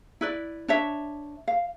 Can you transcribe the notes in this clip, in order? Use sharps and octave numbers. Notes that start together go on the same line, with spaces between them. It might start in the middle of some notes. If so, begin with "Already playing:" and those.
E4 B4 D5
D4 C#5 E5
F5